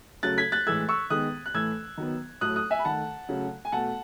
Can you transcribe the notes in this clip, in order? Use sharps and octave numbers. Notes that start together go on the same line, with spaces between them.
C#3 F#3 A3 F#6 A6
G#6 B6
F#6 A6
A2 E3 G#3 E6 G#6
C#6 E6
D#3 G#3 B3 D#6 F#6
F#6
A2 E3 A3 E6 G#6
D#3 F#3 B3
A2 F#3 A3 D#6 F#6
D#6 F#6
E5 G#5
B5
D#3 A3 F#5 A5
C#3 F#3 A3
G#5
B2 A3 F#5 A5